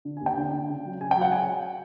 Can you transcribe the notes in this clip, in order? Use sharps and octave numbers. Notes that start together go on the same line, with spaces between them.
D3
D#2 G#5
G5
D3
D3
C#3
F#3
C#3 G#5
G5
F#3 F#5
G#5